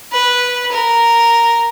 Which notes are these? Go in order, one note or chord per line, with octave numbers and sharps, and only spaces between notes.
B4
A#4